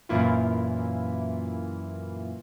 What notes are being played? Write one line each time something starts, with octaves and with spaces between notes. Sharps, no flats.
F#2 A#2 E3 A#3 E4 F4